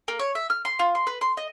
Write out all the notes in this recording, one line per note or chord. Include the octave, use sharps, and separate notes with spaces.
A#3
C#5
E5
F6
C6
F4
C6
B4
C6
D#5